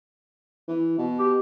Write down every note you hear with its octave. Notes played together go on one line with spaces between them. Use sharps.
E3
B2
G4